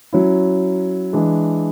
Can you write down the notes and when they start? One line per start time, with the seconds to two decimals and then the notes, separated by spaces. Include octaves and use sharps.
0.13 F#3 C#4 E4
1.13 E3 G#3 D4